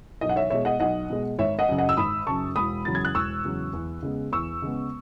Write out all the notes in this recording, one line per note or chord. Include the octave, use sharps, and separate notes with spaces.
B1 D#5
F#5
C#5 E5
B2 G#3 C#5 E5
D#5 F#5
B1 D#5 F#5
B2 G#3
G#1 C#5 E5
D#5 F#5
F#2 C#3
D#5 F#5
E6
G#1 B5 D#6
F#2 C#3 A5 C#6
E1 B5 D#6
E2 C#3 F#3 A6
G#6
F#6
E1 C#6 E6
E2 C#3 F#3
E2
C#3 G#3 B3
E2 C#6 E6
C#3 G#3 B3